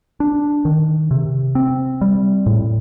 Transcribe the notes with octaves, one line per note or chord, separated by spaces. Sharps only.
D4
D#3
C3
C4
G3
A2